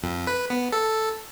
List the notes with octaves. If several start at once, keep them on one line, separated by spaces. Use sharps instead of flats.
F2
B4
B3
A4